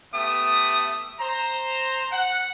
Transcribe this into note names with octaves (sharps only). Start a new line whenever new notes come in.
A3 B3 G4 E5 D#6
C5 A#5
F#5